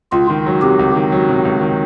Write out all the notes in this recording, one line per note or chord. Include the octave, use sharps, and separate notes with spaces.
C#2 F4
D#3
F#3
C3 G4
C#2
D#3
F#3
C3
C#2
D#3